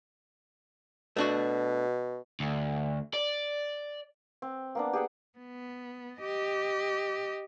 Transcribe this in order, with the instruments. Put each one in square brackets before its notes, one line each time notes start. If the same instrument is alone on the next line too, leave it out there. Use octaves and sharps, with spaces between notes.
[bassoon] B2 [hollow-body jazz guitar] A3 D4 F#4
[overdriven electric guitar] D2
D5
[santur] C4
A#3 B3 D4
G4 G#4 F#5 G5
[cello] B3
G4 D#5